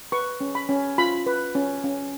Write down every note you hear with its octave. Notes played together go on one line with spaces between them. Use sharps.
B4 C#6
C#4
B5
C#4
F4 B5
B4
C#4
C#4